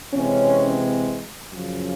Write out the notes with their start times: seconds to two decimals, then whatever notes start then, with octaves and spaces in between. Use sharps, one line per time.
0.13 C3 E3 G#3 C4 C#4
1.51 F#2 C#3 F3